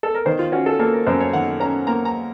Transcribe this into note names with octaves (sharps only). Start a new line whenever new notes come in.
A4
A#4
D#3 C5
F4
C#4 F#4
A4
A#3 A4
A#4
F#2 C5
C#5
D#3 F#5
C#4 A#5
A#3 A#5
A#5